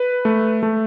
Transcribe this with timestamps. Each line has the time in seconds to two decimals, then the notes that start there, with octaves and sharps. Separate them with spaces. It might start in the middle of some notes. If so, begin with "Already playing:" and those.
Already playing: B4
0.25 A3
0.63 A3